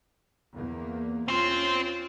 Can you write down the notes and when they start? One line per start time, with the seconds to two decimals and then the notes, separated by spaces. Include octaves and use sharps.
0.53 E2 A#3
1.28 C4 C#4 F4 C5